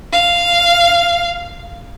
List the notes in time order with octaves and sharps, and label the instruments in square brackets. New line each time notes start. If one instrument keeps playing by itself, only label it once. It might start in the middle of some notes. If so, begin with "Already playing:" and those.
[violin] F5